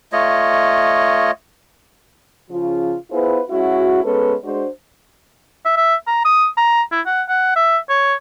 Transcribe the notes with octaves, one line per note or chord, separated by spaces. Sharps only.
A3 F4 C#5 D#5
C#3 F3 F4
B3 E4 F4 G#4 B4 C5
G#3 C#4 E4 F#4
G#3 B3 C#4 A4 B4
G#3 D4 F#4 C5
E5
E5
A#5
D#6
A#5
E4
F#5
F#5
E5
C#5